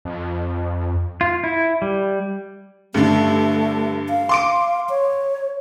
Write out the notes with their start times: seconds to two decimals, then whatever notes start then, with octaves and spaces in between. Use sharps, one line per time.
0.05 F2
1.21 F4
1.44 E4
1.82 G3
2.94 G2 D3 A3
4.09 F5
4.29 C6 D6 D7
4.90 C#5